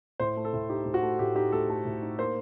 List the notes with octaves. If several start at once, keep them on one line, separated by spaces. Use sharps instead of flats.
A2 C5
A3
A4
A2
D#4 G4
A2
F#4
A3
A2 G4
D#4 G4
A2 A4
A3
A2
D#4
A#3 C5